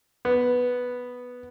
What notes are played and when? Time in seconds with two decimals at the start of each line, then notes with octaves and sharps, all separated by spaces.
0.25 B3